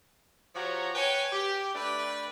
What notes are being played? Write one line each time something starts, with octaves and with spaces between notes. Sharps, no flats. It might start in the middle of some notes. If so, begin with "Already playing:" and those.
F3 F#4 G4 C#5 A#5
B4 C#5 G5 G#5
G4
A3 D4 B4 D5 G5